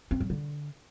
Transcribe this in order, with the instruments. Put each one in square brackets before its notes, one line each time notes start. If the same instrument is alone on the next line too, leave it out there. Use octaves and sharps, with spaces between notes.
[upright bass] C4
F#3
D3